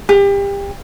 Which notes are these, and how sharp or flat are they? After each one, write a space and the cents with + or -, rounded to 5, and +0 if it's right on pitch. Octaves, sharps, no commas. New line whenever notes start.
G4 +30